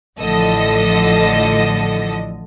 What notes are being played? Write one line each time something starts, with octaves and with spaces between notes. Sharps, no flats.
A1 A2 D3 F3 A4 D#5